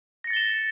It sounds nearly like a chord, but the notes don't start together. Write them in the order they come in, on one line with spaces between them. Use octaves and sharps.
A#6 C#7 A6 G7 E7